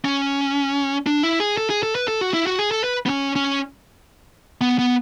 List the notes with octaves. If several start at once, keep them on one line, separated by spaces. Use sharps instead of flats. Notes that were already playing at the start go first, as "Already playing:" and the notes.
C#4
D4
E4
G#4
A4
G#4
A4
B4
A4
F#4
E4
F#4
G#4
A4
B4
B3
C#4
C#4
B3
B3